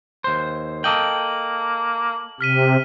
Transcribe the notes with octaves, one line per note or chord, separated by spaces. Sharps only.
D#2 C5
A#3 A4 D#5 G5 F#7
C3 F6 B6 D#7